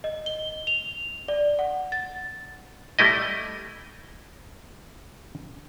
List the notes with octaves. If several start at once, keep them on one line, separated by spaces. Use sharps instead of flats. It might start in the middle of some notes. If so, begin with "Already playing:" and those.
D#5
G7
F7
D5
F#5
A6
G3 A3 E4 D#5